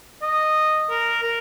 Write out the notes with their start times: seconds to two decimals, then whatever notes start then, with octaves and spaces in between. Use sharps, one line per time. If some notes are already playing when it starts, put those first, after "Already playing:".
0.23 D#5
0.90 A#4
1.24 A#4